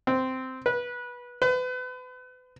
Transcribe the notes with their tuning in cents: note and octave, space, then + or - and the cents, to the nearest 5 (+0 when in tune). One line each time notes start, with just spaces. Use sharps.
C4 -10
B4 -20
B4 +35